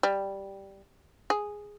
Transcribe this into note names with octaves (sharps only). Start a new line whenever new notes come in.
G3
G#4